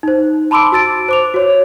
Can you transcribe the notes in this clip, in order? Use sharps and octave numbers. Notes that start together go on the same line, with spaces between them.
D#4 C5
A5 B5 C6 D6 E6 D7
F#4 E6 A6 D7
C5 D6 F7
F#4 C#5